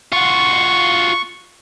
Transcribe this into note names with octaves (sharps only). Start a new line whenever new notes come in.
F4 F#4 C#6